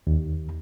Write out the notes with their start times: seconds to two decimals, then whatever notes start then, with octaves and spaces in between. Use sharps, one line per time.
0.07 D#2